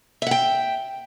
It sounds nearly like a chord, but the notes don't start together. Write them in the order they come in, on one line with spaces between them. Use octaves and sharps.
E5 F#5 G5